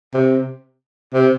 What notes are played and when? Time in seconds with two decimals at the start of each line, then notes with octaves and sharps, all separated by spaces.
0.14 C3
1.14 C3